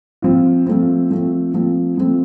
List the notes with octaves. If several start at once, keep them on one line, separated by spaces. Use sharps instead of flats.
F3 C4 F4
F3 A3 C4
F3 A3 C4
F3 A3 C4
F3 A3 C4